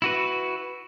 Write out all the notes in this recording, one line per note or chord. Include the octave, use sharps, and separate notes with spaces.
E4 F#4 B4